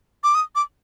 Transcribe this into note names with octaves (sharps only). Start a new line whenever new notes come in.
D6
D#6
D6